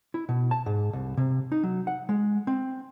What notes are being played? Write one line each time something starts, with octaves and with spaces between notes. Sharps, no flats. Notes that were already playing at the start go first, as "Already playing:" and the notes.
E4
B2
A5
G#2
C2
C3
D#4
F#3
F#5
G#3
C4